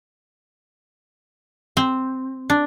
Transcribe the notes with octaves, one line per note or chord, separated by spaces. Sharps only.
C4
D4